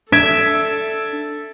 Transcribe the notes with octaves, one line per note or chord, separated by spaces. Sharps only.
D4 A4 E5 G#6 D7